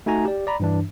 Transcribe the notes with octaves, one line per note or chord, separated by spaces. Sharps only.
A3 D#4 F#4 G#5 A#5
G4 D5
D5 A#5 B5
G2 E3 D4